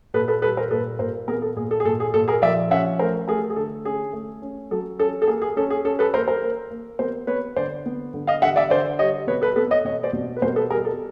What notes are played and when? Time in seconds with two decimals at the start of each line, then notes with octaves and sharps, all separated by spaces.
0.14 A#2 A4 B4
0.28 A4 B4
0.42 G3 A4 B4
0.57 A#4 C5
0.71 A#2 A4 B4
0.99 A#2 A#4 C5
1.28 B3 G#4 A#4
1.42 A4
1.56 A#2 G#4
1.71 A4
1.80 G#4
1.85 A#2 A4
2.00 G#4
2.14 A#2 A4
2.28 G#4 A#4
2.42 F3 D5 E5
2.70 C#4 E5 F#5
2.99 A3 A#4 C5
3.28 A3 G#4 A#4
3.50 G#4
3.56 D3 A4
3.85 C#4 G#4
4.13 A3
4.42 C#4
4.71 F#3 A4
4.99 C#4 A4
5.22 A4
5.27 A#3 G#4
5.42 G#4
5.57 C#4 A4
5.70 G#4
5.85 C#4 A4
5.99 A4 B4
6.14 A#3 A#4 C5
6.28 A#4 C5
6.42 A#3
6.71 A#3
6.99 B3 A#4 C5
7.27 B3 B4 C#5
7.56 D3 C5 D5
7.86 B3
8.14 D3
8.27 D#5 F5
8.42 D3 E5 F#5
8.56 D5 E5
8.70 D3 C5 D5
8.99 G3 C#5 D#5
9.27 B2 B4 C#5
9.42 A4 B4
9.56 B3 A4 B4
9.71 C#5 D#5
9.85 B2 C#5 D#5
10.03 C5 D5
10.13 B2
10.37 B4
10.42 B2 A#4 C5
10.56 A4 B4
10.70 G3 G#4 A#4
10.85 A4